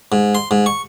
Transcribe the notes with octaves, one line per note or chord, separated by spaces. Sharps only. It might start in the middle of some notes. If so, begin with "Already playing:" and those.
G#2
C6
G#2
C#6